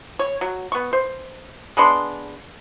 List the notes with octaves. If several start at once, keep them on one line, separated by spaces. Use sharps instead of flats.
C#5
F#3
B3 C#6
C5
G#3 B3 D4 C6